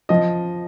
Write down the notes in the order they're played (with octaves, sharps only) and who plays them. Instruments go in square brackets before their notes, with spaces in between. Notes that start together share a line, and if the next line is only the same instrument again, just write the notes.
[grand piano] F3 D#5